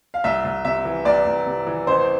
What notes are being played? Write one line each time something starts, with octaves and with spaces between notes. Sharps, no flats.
F5
C2 E5
C2
C3 E5
E3
C2 D5
C2
C3
E3
A1 C5